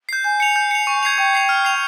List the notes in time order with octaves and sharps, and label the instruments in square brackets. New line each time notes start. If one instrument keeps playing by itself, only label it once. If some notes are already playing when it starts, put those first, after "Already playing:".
[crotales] G6 C7
[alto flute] G#5 [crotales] G6
[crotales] C#7 F7
G6
C#7 F7
C#6
G#6 C7 F7
[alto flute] G5 [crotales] C#6
[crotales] G#6 C7 F7
F6
C7 F7